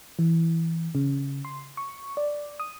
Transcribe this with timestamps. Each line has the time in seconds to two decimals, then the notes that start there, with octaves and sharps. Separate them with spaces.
0.19 E3
0.95 C#3
1.45 C6
1.77 C#6
2.17 D5
2.60 D#6